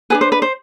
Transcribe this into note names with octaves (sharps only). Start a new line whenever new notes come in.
D4 G#4 B4 G#5
C5
B4
C5